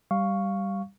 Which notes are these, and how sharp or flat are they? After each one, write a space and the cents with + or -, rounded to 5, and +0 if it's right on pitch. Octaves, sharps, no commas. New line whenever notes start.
G3 +0 F5 +0 C#6 +0